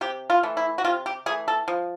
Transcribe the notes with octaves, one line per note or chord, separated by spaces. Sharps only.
C3 G4
F4
E3 A3
E4
F#4
C3 F4
G4
E3 A3 G#4
A4
F3